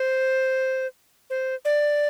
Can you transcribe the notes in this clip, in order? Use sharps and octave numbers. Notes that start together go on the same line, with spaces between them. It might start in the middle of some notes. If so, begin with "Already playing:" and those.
Already playing: C5
C5
D5